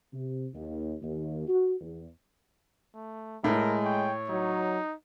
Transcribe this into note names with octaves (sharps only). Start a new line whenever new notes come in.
C3
D#2
D#2
F#4
E2
A3
A2 G#3 A#4
C#5 G5
F#3 D#4